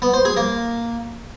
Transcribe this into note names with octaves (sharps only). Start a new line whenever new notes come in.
B3
C5
G#4
A#3